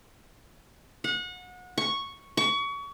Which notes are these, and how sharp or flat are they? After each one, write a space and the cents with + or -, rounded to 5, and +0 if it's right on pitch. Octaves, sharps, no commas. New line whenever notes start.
F#5 -30
C#6 -5
C#6 +30